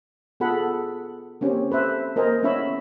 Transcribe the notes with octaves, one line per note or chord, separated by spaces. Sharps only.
B3 F4 G#4 A4 F#5 B5
A#3 C4 C#4 G4
A4 B4 C5 E5
A#3 A#4 C5 D#5 G#5
B3 C#4 E4 C#5 E5 B5